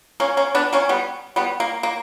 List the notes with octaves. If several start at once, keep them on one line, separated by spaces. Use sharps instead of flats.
A#3 C#4
A#3 C#4
B3 D4
A#3 C#4
G3 B3
G3 B3
A#3
A#3